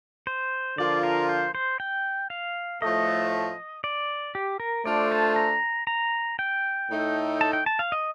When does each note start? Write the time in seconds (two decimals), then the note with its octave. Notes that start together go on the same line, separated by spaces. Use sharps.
0.27 C5
0.78 D3 F3 A#3 F4 D5
1.03 A#4
1.29 C5
1.55 C5
1.80 G5
2.30 F5
2.82 A2 F3 A3 D#5
3.84 D5
4.35 G4
4.60 A#4
4.85 A3 D4 F4 A4 C5 D5
5.12 A5
5.36 A#5
5.87 A#5
6.39 G5
6.90 A2 A3 D#4 A4
7.41 A5
7.53 G5
7.66 A5
7.79 F5
7.92 D#5